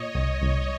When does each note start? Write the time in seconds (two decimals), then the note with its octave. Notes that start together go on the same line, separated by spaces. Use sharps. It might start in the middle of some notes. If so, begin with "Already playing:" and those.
Already playing: A#2 C#5 D#5
0.15 C2
0.42 C2 C#5 D#5